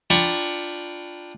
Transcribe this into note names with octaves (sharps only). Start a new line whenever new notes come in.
D4 F4 G5 A#5 B5 C#6